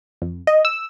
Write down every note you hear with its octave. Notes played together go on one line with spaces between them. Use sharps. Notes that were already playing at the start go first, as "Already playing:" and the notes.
F2
D#5
E6